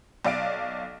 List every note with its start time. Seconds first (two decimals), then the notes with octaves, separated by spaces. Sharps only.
0.25 B1 D5 F5 D7